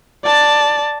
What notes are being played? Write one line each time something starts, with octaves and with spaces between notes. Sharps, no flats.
D5 A5